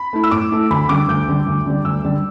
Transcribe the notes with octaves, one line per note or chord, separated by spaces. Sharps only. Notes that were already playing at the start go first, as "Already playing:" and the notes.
Already playing: B5
A3 E4
E6
A2 D6
A3 E4
D2 B5
D3 G3 D6
D2 G6
D3 G3
D2
D3 G3
D2 E6
D3 G3